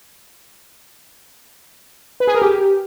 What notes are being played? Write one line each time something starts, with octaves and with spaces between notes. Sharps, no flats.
B4
G#4
A#4
G4